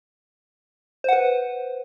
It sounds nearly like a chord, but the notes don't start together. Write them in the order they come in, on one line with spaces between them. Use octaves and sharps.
C5 F#5 B4